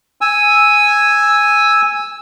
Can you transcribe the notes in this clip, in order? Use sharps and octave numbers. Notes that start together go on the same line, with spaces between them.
G#5 E6